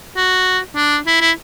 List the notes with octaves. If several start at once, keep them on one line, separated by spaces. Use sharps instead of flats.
F#4
D4
E4
E4